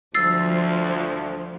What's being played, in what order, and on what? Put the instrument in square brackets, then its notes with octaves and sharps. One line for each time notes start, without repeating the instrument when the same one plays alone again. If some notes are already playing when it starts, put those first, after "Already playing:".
[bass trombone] D2 [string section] F3 [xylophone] E6 A6 C7